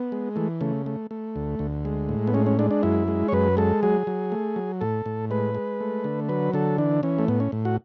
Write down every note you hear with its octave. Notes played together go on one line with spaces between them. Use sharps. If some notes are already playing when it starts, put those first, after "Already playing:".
Already playing: B3
G#3
E3 A3
C#3 A3
A3
A3
D2
D2
G#3
A2
B3
G#3 C#4
C#4
G#3 D4
D4
F#2 E4
G#3
C#5
F#2 B4
G#3 A4
F#3 G#4
F#3
A3
F#3
A2 A4
A2
G#3 B4
G#3
A3
D3
F#3 B4
D3 A4
E3 D4
E3 C#4
A3
A2 B3
C#4
A2
F#4